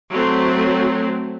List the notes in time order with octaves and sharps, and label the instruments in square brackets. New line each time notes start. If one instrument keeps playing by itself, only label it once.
[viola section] F#3 A3 C4